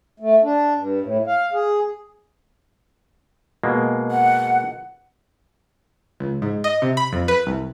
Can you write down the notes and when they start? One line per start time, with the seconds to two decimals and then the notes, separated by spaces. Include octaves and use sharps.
0.20 A3
0.43 D4
0.76 G2
1.02 A2
1.27 F5
1.53 G#4
3.64 B2 G#3 A#3
4.11 F#5
6.20 C#2
6.42 G#2
6.64 D#5
6.82 C3
6.97 B5
7.13 F2
7.28 B4
7.47 C2